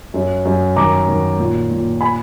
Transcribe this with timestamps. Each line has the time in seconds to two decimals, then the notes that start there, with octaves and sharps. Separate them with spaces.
0.14 F#2
0.45 F#2
0.76 D#3 A#5 D6
1.08 D#3
1.39 A#2
1.70 A#2
2.01 G#5 B5